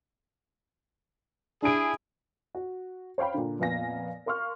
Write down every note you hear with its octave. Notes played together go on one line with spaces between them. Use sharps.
D4 E4 G#4 D7
F#4
C5 C#5 F5 G5 B5
A#2 D3
F2 A#2 B3 F5 G#5 A#6
A#4 F5 C6 C#6 F6